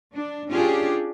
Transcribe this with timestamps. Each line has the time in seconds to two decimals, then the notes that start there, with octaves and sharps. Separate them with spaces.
0.14 D4
0.50 C#4 D4 F4 G4 G#4